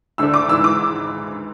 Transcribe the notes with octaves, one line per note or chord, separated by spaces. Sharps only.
D2 D3 A3 D4 E6
D6
G#1 G#2 E3 E6
D6